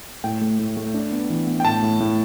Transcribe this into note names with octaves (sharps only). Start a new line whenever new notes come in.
A2 G5
A3
A2
A3
D4
B3
E3
B3
G5
A2 A5
A2
A2